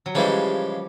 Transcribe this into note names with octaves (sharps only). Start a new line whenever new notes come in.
F#3
C#3 E3 F3 G3 G#3